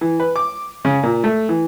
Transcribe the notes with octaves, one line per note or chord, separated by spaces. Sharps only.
E3
B4
D6
C#3
A#2
A3
E3